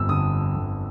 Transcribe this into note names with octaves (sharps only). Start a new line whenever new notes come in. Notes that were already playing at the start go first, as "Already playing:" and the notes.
Already playing: G1 F2 E6
D3 D#6
G1